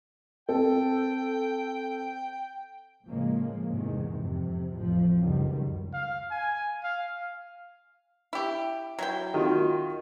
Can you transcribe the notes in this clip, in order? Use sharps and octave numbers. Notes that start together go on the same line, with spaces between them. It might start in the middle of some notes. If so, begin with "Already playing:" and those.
C4 A4 G5
A2 C#3 F3 G#3 A#3
E2 G#2 C3 D#3 G#3
F2 C3
A1 F2 F3
C#2 F#2 D#3 G3
F5
G#5
F5
E4 G4
F#3 E4 G5
D#3 F4 F#4